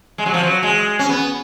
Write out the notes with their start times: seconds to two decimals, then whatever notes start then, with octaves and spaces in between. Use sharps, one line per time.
0.18 G#3
0.26 F#3
0.34 F3
0.43 F#3
0.63 G#3
0.99 C#4
1.09 B3